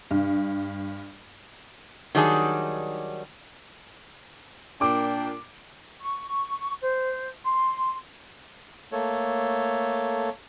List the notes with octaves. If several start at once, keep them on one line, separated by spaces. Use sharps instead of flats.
G2
D#3 F#3 G3 D4 D#4 G#4
A#2 D4 G5 D6
C#6
C5
C6
A3 A#3 A4 C#5